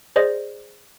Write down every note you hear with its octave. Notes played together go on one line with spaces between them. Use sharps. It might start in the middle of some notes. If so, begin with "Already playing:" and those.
G#4 C5 D5 D#5